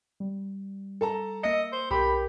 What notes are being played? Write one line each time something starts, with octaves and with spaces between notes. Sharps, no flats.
G3
A4 A5 A#5
A#3 D#5 E5 E6 C#7
C5
B1 G4 A#4 B5 G6